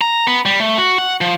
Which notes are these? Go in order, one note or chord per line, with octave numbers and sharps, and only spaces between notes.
A#5
B3
G3
A3
F#4
F#5
F3